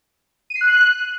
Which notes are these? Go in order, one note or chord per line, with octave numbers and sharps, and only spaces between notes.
D#7
C7
F#6